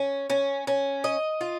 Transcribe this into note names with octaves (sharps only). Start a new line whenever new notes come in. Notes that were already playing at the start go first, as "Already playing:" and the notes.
Already playing: C#4
C#4
C#4
D#5
F4